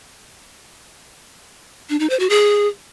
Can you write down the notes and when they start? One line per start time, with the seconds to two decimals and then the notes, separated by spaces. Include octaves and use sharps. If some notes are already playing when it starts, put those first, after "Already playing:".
1.90 D4
2.00 D#4
2.10 C5
2.20 F#4
2.30 G#4